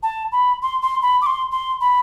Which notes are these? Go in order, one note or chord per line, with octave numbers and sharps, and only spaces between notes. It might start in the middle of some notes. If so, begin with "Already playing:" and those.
A5
B5
C6
C6
B5
D6
C6
C6
B5